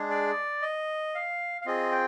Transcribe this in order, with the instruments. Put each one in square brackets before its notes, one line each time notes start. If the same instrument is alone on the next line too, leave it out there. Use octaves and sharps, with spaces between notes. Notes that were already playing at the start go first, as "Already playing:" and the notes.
Already playing: [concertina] G#3 D4 G#4
D5
D#5
F5
F5
C4 F4 G#4 D#5
G5